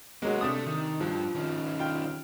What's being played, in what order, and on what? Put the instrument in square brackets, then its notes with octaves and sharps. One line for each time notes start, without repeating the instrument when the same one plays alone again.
[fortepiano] F#3 G#3 [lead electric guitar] A#3 B3
[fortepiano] C3 D4 D#6 [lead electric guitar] A3
[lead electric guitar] D#3
[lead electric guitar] G2 [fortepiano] F3
[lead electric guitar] D#3 C#4
[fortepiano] F4 G5